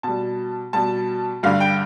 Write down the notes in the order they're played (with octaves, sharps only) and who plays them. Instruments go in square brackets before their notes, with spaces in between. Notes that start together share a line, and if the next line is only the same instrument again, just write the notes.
[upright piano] B2 G3 A5
B2 G3 A5
G2 D3 G3 F5
G5